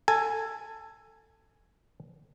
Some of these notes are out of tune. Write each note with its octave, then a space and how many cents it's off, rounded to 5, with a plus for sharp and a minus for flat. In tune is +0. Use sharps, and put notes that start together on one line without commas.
A4 +15 G#5 +0